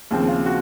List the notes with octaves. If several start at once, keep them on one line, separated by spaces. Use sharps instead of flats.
D#2 C#3 F3 C4
F4
F#4